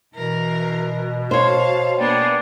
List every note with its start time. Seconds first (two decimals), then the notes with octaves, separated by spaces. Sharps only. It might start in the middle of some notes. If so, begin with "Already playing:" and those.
0.14 B2 E3 A#4
1.31 C5 C#5 F5 A5
1.98 A#3 B3 D4 G#4 D5 G5